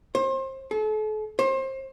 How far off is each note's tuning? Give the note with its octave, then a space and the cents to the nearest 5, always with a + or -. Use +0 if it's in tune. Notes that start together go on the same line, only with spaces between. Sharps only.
C5 +30
A4 -40
C5 +30